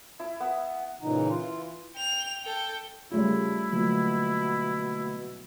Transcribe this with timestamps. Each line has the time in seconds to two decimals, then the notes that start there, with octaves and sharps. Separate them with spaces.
0.20 E4
0.40 B3
1.02 A#2 C#3 E3 D#4
1.29 E3 F4
1.95 G5 F7
2.44 A4 G5
3.12 C#3 G3 A3 E4 F4
3.72 B2 D3 F#3 A3 A#3 F4